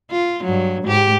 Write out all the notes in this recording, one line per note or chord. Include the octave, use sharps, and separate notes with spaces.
F4
G2 F#3
G#2 G4